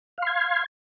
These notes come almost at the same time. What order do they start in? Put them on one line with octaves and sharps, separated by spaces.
F5 C6 G#6